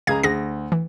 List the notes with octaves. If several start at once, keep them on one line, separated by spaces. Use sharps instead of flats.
C#2 G#4 F5 A#5 G#6
D2 G#4 A#6
E3